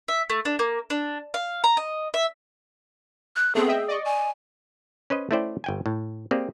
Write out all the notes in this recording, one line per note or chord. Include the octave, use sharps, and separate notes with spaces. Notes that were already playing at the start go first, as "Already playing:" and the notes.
E5
A3
D4
A#3
D4
F5
A#5
D#5
E5
F#6
A3 B3 C4 G#4
D#5 E5 G5
D5 D#5 C#6
G#5
C#4 B4 C5 D#5
A3 C#4 E4 C5 D5 G5
G1 G5 G#5
A2
A#3 C4 G4 G#4 D5